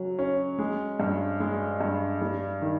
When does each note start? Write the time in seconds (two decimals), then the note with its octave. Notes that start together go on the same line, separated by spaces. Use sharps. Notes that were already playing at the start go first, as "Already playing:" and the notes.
Already playing: C#3 F#3 C#4
0.19 C#4
0.59 G#3
1.00 G2
1.40 G#3
1.81 G2
2.21 G3
2.61 D#3